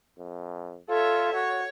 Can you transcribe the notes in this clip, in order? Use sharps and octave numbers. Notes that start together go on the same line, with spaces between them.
F2
F4 A4 C#5 E5
F#4 C#5